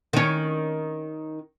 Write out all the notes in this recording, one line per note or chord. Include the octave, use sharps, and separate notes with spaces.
D#3 C#4